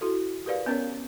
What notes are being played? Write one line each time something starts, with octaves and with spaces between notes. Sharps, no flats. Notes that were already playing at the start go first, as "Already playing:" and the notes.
E4 F#4 A4
G4 A#4 B4 D5 F5
B3 C#4 A#4 C#5